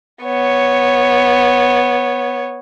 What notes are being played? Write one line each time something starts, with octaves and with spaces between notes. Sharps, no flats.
B3 C#5